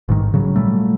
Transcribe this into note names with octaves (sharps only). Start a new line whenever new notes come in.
A1 G#2 D#3
C#3 F#3
A#2 F#3 G3 A3